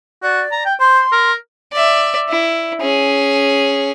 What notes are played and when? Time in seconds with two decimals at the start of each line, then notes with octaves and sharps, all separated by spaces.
0.23 F#4 D5
0.52 A#5
0.65 G5
0.80 C5 C6
1.12 A#4
1.73 D5 E5
2.29 E4
2.81 C#4 G#4